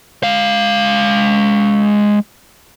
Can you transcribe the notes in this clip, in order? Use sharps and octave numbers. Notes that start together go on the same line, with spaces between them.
G#3 F5